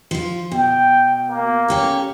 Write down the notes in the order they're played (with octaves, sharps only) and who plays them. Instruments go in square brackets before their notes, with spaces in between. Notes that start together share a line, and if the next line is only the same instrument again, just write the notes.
[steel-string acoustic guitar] F3 F4
[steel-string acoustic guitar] B2 [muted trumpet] G5
[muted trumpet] A#3
[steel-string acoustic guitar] C#4 G4 A4